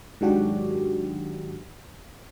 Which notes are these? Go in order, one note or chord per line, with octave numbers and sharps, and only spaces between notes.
G#2 D#3 F#3 D4 F#4 G4